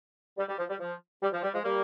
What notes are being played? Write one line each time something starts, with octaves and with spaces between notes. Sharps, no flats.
G3
G3
F3
G3
F3
G3
F3
G3
F3 G#3
G3 A#3